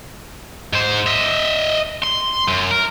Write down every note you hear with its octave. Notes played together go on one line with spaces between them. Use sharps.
G#2 C5
D#5 E5
C6
F#2
A#4